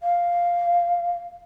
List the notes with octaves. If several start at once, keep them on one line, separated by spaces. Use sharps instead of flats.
F5